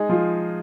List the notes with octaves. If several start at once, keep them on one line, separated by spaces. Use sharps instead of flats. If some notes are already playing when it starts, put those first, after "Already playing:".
Already playing: G#3 D#4 G#4
F3 F4